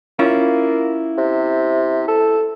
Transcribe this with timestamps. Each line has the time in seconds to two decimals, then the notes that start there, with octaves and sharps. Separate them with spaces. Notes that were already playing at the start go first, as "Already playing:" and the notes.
0.19 A#3 C#4 E4 F4
1.18 C3
2.08 A4